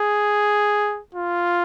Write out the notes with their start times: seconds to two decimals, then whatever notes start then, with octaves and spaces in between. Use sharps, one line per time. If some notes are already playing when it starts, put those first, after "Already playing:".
Already playing: G#4
1.15 F4